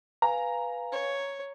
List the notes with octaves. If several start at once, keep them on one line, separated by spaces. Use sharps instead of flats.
B4 F5 G#5 A#5
C#5